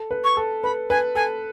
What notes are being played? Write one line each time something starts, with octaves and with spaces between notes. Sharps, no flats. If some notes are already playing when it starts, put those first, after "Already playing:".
Already playing: A4
B4
C#6
A4
B4 B5
B4 G#5
A4 G#5